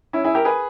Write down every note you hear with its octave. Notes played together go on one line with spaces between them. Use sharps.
C#4 E4
E4 G#4
G4 A#4
G#4 B4